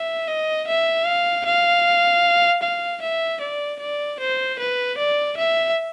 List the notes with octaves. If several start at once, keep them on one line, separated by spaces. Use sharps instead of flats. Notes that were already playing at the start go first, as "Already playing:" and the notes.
Already playing: E5
D#5
E5
F5
F5
F5
E5
D5
D5
C5
B4
D5
E5